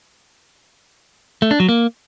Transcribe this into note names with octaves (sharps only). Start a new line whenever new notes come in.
A3
D4
F#3
A#3